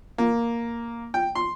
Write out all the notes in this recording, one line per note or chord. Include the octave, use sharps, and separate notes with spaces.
A#3
G5
C6